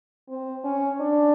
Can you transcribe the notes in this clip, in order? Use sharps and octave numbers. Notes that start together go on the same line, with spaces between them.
C4
C#4
D4